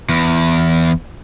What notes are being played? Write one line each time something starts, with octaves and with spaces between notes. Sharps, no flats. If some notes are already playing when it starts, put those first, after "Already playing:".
E2